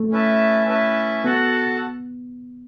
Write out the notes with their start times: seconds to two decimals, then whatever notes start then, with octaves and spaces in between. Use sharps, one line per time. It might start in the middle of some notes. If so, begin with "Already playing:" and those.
Already playing: A3
0.11 C#4 E4 B4 E5 A5
0.67 C#4 E4 B4 E5 A5
1.24 B3 F#4 A4 F#5 A5